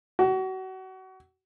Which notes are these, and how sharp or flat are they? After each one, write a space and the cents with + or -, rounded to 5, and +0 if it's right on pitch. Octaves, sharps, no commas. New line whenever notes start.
F#4 +30